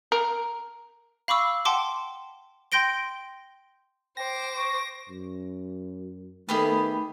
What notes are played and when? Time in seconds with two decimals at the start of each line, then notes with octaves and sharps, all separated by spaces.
0.12 A#4
1.28 F5 B5 C#6 D6 E6
1.65 F#5 G5 A5 C6 D6
2.72 G5 C6 G6 A#6 D7 G7
4.17 C5 G5 D6 A#6
4.57 C#6
5.09 F#2
6.49 D#3 A3 B3 G4 G#4